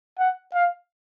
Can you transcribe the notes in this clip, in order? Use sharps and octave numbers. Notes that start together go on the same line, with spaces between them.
F#5
F5